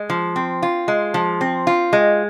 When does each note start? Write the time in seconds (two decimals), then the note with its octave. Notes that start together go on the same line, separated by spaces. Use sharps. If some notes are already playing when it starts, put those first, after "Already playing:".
Already playing: G#3
0.10 F3
0.36 C4
0.63 F4
0.88 G#3
1.14 F3
1.41 C4
1.67 F4
1.93 G#3